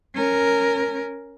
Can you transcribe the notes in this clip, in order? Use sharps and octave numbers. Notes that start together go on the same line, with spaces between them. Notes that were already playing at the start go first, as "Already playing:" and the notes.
C#4 A#4